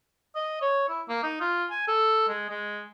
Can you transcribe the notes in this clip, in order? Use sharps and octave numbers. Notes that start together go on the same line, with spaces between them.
D#5
C#5
E4
A#3
D#4
F4
G#5
A4
G#3
G#3